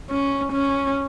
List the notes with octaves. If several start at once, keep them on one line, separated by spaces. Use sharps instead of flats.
C#4
C#4